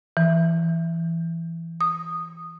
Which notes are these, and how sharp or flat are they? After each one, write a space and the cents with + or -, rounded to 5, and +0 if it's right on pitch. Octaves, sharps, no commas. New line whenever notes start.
E3 +15
D#6 -10